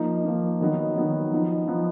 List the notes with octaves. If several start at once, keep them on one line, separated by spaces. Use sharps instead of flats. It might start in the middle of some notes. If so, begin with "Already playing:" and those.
Already playing: F3 A#3 D#4
F3 A#3 D#4
D#3 F#3 B3 D#4
D#3 F#3 B3 D#4
F3 B3 D#4
F3 B3 D#4